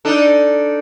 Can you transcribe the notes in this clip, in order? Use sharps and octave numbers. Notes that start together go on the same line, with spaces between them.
D4 D#4 A4